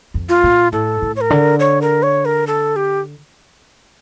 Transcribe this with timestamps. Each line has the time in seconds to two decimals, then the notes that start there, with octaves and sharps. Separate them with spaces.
0.14 F2
0.29 F4
0.44 A#2
0.72 A2 A4
1.02 A2
1.16 C#5
1.21 A#4
1.30 D3
1.60 C#5
1.82 A#4
2.03 C#5
2.25 A#4
2.47 A4
2.76 G4